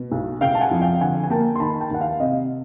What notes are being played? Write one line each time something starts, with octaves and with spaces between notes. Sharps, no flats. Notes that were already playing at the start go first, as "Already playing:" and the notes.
Already playing: B2
B1
C#3 F5 G5
A5
F#5 G#5
F2
F5 G5
D3 F#5 G#5
G#5
A#3 G5 A5
C6
D#3 A5 B5
G5 A5
D#2 F#5
F5 G5
C3 D#5 F5